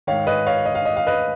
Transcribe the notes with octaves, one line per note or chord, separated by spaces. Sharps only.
G#2 D#3 C#5 F5
B4 D#5
C#5 F5
D#5
F5
D#5
F5
B4 D#5